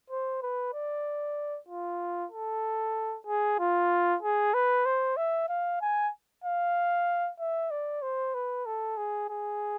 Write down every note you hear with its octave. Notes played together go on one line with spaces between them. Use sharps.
C5
B4
D5
F4
A4
G#4
F4
G#4
B4
C5
E5
F5
G#5
F5
E5
D5
C5
B4
A4
G#4
G#4